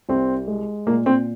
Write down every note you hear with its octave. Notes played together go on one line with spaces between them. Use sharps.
C2 C4
G#3
A#2 A#3
C4